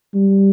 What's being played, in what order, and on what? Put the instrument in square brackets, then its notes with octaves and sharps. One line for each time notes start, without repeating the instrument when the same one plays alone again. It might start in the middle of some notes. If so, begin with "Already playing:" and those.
[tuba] G3